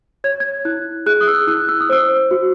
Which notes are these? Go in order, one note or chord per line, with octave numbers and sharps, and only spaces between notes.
C#5 G#6
G#6
E4 F#6
G#4 F#6
D#6
E6
E4 F#6
E6
D#6
C5 E6
F#4